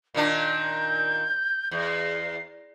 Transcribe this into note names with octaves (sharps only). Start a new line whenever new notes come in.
A#2 D#3 D4 F5
G6
E2 G6
C7